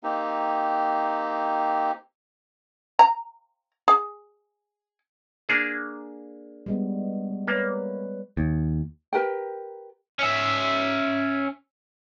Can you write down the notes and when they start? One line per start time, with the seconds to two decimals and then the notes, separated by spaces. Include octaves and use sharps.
0.03 A#3 C4 D#4 G4
2.99 A#5
3.88 G#4
5.49 A#3 D4 G#4
6.66 G3 G#3 B3
7.47 A#3 B4 C#5
8.37 D#2
9.13 G4 A#4 B4 G5
10.19 C#4 E5